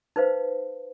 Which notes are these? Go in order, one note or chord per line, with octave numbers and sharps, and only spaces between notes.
D#4 B4 C5 F5